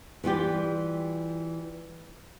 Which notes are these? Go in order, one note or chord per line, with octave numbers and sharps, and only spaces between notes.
E3 G3 F4 G4